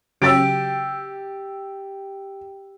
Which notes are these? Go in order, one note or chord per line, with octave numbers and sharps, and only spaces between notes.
C#3 F#3 G4 E6 A6 D7